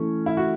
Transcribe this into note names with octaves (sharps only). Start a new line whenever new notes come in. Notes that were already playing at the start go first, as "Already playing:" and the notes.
Already playing: E3 A3 C#4 E4 A4
E4
F#4